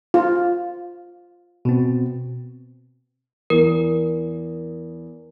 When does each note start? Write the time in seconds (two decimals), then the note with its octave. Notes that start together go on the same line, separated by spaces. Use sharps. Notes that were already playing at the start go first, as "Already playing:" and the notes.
0.14 F4
1.65 B2 C4
3.50 E2 A#4